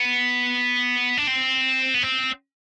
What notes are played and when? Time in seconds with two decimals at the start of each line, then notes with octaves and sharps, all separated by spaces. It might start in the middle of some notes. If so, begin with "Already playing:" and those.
Already playing: B3
1.18 D4
1.27 C4
1.94 B3
2.03 C4